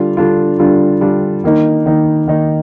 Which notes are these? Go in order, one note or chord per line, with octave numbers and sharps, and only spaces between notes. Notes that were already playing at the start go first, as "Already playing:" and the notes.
Already playing: D3 G3 D4 F4
D3 G3 D4 F4
D3 G3 D4 F4
D3 G3 D4 F4
D#3 A#3 D#4
D#3 A#3 D#4
D#3 A#3 D#4